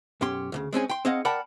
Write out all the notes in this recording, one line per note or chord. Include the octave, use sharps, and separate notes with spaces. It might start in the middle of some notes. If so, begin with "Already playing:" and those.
B1 F#2 C#4 G4 C6
D2 A2 C#3
G#3 C4 C#4 G#4
G5 C6
C4 D#4 G#4 D#5 F5 F#5
A#4 D5 F#5 G5 A5 B5